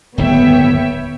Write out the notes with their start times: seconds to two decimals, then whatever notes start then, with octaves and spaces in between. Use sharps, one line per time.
0.18 D1 G1 D#2 B3 C#5 E5 G5